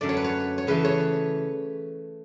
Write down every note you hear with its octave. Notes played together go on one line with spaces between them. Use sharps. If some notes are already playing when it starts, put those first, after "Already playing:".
F#2 D3 A3 D5
C#5
B4
C#5
C#5
C#3 E3 A3 B4
C#5